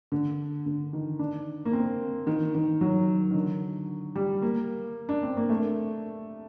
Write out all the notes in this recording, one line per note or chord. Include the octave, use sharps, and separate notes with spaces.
D3
D3
D#3
D4
A#3
C4
D#3
D#3
F#3
D#3
D3
G3
A#3
D4
C4
A#3
A3